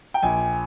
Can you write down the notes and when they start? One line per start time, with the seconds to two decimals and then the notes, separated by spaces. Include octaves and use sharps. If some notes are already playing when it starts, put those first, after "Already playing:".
0.14 G5
0.23 A#1 G#5